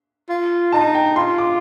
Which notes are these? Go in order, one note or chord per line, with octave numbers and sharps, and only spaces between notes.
F4
D#4 A5
G5
F4 C6
D6